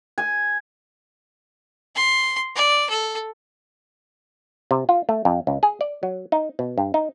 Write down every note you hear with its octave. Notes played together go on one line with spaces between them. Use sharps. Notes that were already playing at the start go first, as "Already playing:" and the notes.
G#5
C6
D5
A4
C3
F4
A3
F2
C#2
G#4
D5
F#3
D#4
B2
G2
D#4